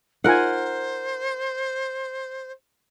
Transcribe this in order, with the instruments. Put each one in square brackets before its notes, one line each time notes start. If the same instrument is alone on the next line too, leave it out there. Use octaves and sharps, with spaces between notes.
[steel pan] D#4 F4 G#5 [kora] A#4 F#5 [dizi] C5